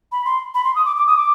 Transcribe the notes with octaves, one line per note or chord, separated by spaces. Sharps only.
B5
C6
B5
C6
D#6
D6
D6
D#6
D6